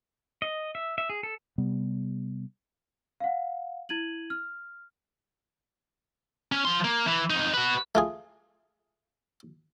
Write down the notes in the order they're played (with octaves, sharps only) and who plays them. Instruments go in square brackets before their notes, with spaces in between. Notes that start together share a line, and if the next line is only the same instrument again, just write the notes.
[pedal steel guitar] D#5
E5
E5
G#4
A4
[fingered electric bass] C3 G3 B3
[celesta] F5 F#5
E4 G#6 D#7 F#7
F6
[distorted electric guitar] C#4
F3 C6
A#3
E3
F2 D#4
F#4 B4
[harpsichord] A3 F4 G#4